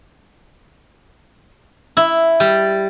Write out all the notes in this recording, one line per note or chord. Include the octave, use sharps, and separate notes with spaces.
E4
G3